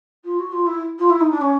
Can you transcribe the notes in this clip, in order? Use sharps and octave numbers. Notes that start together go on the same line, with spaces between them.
F4
F#4
F4
E4
F4
E4
D#4
D4
C#4